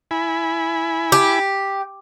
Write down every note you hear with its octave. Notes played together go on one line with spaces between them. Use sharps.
E4 G#5 B5
G4